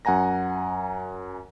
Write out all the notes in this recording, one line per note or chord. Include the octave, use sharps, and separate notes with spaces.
F#2 F#5 G#5 A#5 A#6